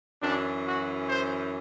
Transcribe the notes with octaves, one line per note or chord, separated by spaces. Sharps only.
F#2 E3 D4
F#4
C5